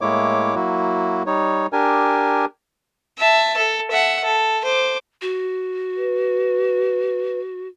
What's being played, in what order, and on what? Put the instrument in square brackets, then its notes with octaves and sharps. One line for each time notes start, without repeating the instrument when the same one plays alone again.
[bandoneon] A2 G#3 A#3 E4 C#5 D6
F#3 A#3 E4 F#4
G3 D#4 C#5
D4 G4 A#4 G#5
[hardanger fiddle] E5 A5
A4
E5 F#5
A4
C5 D6
[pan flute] F#4
[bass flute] B4